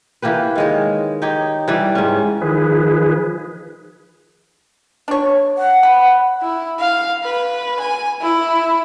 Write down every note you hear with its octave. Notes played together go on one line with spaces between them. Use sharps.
E3 A#3 G4 B4
D#3 G#3 C#5
D#4 G4 C#5
E3 G3 D5
G#2 C#4
D#3 F3 G#4 B4
D4 C#5
F#5
B5
E4
F5
B4
G#5
E4